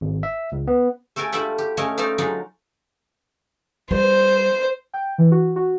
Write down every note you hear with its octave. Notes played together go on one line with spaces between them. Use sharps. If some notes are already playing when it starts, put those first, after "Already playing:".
G#1
E5
C#2
B3
A3 A4 A#4 G5 G#5
G3 A3 D4 F4 E5 F#5
G4
A3 C#4 A#4 C#5 D#5 F5
A3 D#4 C5 D5 F5
F#3 G#3 D4 D#4 F4
G3 C5
G5
E3
F#4
F#4